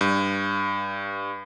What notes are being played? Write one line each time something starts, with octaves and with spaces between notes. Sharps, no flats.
G2